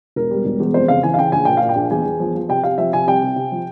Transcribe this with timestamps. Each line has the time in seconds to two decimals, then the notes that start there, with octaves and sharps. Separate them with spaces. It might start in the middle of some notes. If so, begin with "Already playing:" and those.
0.16 E1 A#4
0.31 G3
0.45 E1
0.60 E2
0.74 F2 C5
0.88 C#3 F5
1.03 E3 G#5
1.14 F5
1.18 C#3 G5
1.32 A#1 G#5
1.45 A#2 G5
1.57 A#2 F5
1.69 G5
1.76 A#1
1.91 E2 G#5
2.05 E2
2.20 F3
2.35 F3
2.49 C3 G5
2.63 C3 F5
2.78 F3 E5
2.92 C3 G#5
3.07 C2 G5
3.22 C3
3.36 C3
3.52 F3